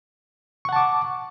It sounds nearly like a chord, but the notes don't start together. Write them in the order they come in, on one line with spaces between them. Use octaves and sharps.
C#6 F#5 A5 D6